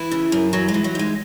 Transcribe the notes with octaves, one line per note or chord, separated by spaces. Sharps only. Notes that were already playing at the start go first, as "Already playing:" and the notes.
Already playing: E3 E4
C#3
F#2
E3 F#3
G#3
E3
F#3
G#2 G#3